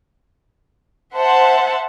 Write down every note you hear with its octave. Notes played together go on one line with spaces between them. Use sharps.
C5 E5 F#5 A5